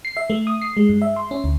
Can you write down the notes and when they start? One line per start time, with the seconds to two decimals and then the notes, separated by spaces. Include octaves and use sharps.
0.05 C7
0.17 E5
0.30 A3
0.47 D#6
0.62 C7
0.77 G#3
0.89 G2
1.02 E5
1.16 C6
1.31 C#4
1.44 D2